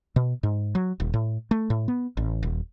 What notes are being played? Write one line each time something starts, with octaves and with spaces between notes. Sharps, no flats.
B2
G#2
F#3
D#1
A2
A3
A2
B3
A1
D#1